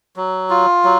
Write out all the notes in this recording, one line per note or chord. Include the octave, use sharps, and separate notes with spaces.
F#3
F4
F#3